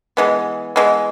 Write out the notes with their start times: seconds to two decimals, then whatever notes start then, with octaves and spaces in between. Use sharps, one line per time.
0.17 E3 G#3 B3
0.76 E3 G#3 B3